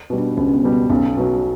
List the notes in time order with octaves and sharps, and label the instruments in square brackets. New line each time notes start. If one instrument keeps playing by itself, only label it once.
[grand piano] B2 G3
[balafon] D4
[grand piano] C#2 [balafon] C#4
[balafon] C#4
B3
[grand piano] B2 G3
[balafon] B3
[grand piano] B1 [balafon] C#4
[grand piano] B2 F#3